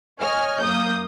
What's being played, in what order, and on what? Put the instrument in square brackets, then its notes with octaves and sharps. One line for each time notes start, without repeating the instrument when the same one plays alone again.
[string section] C#5 D#5 G#5 F6
F#2 A#3 D#6 G6